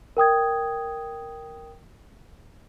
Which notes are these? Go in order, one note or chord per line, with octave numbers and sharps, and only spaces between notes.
A#4 G5 D#6 G#6